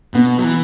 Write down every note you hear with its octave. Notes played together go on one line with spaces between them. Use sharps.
B2 B3
F#3
E3